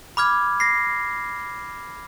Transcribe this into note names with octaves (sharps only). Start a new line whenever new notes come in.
B5 D6 F6 G#6
A#6 C7